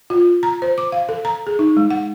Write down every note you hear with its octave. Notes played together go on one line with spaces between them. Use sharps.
F4
A#5
C5
D6
F5
A4
A#5
G#4
D#4
G#3
F#5